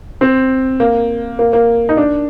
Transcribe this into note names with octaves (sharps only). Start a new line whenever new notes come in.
C4
A#3
A#3
A#3
D#4
D4